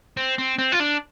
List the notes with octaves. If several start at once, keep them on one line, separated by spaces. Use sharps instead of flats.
C4
C4
C4
F4
D4